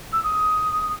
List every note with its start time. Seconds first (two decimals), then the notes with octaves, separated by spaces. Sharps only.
0.13 E6
0.24 D#6